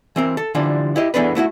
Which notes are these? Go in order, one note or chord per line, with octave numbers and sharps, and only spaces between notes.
E3 C4 A#4
A4
D3 E3 F3 G3 D4
E4 G4 D#5
E2 E3 B3 D4 A4 B4
A3 B3 E4 F#4